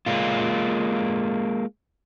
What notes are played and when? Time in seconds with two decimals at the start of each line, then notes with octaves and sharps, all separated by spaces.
0.06 G#3 A#3 F4